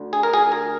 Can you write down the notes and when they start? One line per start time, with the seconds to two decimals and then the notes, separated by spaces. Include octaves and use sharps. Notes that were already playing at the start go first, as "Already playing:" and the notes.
Already playing: D2 D3
0.13 G#4
0.23 A#4
0.33 G#4
0.52 A#4